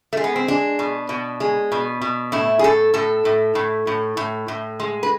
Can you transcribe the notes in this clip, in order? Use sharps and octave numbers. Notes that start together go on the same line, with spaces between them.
A3
G#3
B3
C4
G#3 D4
B2
B2
G#3
B2
B2
A2 E4
G#4
A2 A4
A2 A4
A2
A2
A2
A2
A2
G#3
B4